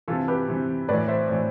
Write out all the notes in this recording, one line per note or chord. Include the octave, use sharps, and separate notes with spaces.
C3 E3 F4 A4
G4 B4
C3 E3
A2 E3 B4 D5
C5 E5
A2 E3